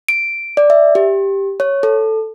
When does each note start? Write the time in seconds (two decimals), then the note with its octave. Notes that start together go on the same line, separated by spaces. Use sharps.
0.09 D7
0.57 D5
0.70 E5
0.95 G4
1.60 C#5
1.83 A4